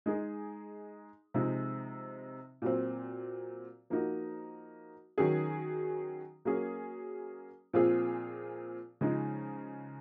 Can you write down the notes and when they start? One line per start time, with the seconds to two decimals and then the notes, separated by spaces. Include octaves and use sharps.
0.06 G#3 D#4 G#4
1.34 C3 F3 G#3 D#4
2.62 A#2 F#3 C4
3.90 F3 A#3 D#4 F#4
5.18 D#3 F#3 C#4 G#4
6.45 F#3 A#3 C#4 G#4
7.73 A#2 F3 C4 F4 G#4
9.01 C#3 F3 G#3 D#4